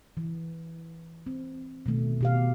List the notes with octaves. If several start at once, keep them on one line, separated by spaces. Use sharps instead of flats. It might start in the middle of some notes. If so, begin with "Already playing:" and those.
E3
C4
B2 D#3 A3
B2 G4 F5